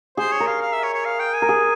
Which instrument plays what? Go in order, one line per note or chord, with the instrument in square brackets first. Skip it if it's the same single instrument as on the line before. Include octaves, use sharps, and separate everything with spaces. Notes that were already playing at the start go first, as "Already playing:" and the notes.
[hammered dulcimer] G#4 [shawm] C5
[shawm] C#5
[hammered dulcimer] A#4
[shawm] F5
F5
E5
C#5
C#5
F5
G5
G#5
[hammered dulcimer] A#4
G#4